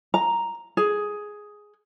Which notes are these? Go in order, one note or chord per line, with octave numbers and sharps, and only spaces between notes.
A#5
G#4